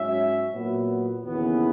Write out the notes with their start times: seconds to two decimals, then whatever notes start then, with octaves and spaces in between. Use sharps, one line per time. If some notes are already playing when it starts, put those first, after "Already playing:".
Already playing: G#2 F#3 C#4 E5
0.54 A#2 F#3 B3
1.24 D#2 C#3 E3 B3